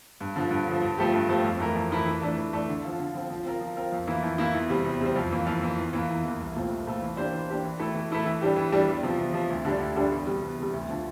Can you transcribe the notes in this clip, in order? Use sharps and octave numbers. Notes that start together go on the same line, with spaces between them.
G2
D3 F3
G2
D3 F3
G2
F3 A3 C4 G4
G2
F3 A3 C4 G4
F2
E3 A3 E4 A#4
F2
E3 A3 E4 A#4
E3
A3 D4
E3
A3 D4
D3
F3 C4 F4
D3
F3 C4 F4
F3
C4 F4 A#4
F3
C4 F4 A#4
F2
E3 A#3 E4
F2
E3 A#3 E4
E2
C3 G3 C4
E2
C3 G3 C4
F2
E3 A#3
F2
E3 A#3
E2
E3 A#3
E2
E3 A#3
C2
A#2 A3 C4 F4
C2
A#2 A3 C4 F4
E3
A#3 D4 G4 C5
E3
A#3 D4 G4 C5
E3
A3 E4 A4
E3
A3 E4 A4
E3
G3 D4 G4
E3
G3 D4 G4
E2
C3 F3
E2
C3 F3
D2
D3 G3 D4
D2
D3 G3 D4
E2
C3 G3
E2
C3 G3
D2
D3 F3